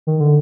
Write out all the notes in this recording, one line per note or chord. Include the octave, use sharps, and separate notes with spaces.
D#3
D3